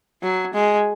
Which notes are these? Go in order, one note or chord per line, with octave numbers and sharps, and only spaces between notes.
F#3
G#3